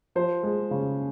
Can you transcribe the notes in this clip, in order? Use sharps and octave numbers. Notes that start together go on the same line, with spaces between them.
F3 C5
G#3
C#3